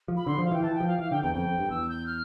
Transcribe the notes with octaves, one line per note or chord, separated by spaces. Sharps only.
F3
B5
D3 C6
F3
F5
E3
G5
E3 A5
G5
F3
F5
E3 F5
D3 G5
E2 G5
F2 G5
F2
G2
E2 E6
G6
F6